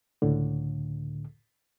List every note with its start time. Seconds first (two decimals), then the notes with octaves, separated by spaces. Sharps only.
0.22 C#2 A2 D3